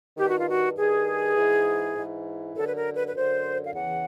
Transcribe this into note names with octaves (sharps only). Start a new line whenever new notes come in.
G2 D#3 G4
F#4
F4
F#4
G2 D#3 G#4
G#2 E3
G#2 E3
F#2 D3 A4
B4
A#4
B4
B4
F#2 D3 C5
F5
E2 C#3 E3 F#5